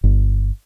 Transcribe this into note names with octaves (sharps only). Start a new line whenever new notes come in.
G1